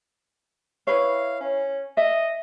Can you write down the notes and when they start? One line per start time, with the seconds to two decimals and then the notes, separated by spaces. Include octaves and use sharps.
0.87 E4 B4 C#5 F5
1.41 C#4
1.97 D#5 E5